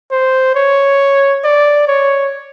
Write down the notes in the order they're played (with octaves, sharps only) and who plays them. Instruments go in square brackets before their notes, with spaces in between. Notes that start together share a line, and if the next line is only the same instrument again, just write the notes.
[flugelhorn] C5
C#5
D5
C#5